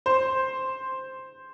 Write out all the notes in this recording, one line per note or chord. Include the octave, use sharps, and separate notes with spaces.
C5